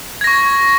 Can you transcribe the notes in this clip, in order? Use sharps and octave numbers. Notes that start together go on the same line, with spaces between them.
C#6 G#6 A#6